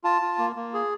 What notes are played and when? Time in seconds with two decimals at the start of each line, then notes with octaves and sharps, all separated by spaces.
0.04 F4 A5
0.22 F4
0.38 A#3
0.56 A#3
0.74 G#4